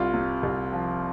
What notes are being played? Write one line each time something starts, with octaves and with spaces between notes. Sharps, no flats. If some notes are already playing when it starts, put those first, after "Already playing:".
Already playing: C2 F4
C3
C2
F3